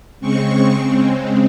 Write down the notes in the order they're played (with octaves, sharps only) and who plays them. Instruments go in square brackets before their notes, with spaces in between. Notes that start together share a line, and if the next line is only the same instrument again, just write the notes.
[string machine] C#3 G#3 C4 C#6